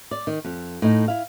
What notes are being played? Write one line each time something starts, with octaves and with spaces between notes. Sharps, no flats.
D5
D#3
F2
A2 D#4
E4 F5